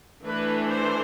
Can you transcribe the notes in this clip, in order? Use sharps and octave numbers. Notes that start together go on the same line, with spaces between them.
E3 A3 D4 B4
C5